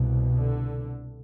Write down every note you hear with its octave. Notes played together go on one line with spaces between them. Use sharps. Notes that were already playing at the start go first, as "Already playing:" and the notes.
Already playing: C2 B2
D3